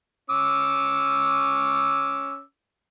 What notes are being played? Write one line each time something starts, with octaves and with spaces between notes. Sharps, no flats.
C#4 D6 E6